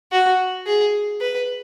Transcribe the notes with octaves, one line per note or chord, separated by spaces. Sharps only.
F#4
G#4
B4